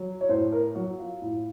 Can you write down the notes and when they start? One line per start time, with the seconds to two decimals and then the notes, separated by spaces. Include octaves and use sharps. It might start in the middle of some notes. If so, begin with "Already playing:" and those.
Already playing: F#3
0.21 C#5
0.29 A2 C5
0.52 A#4
0.75 F#3 F#4
0.99 F4
1.22 A2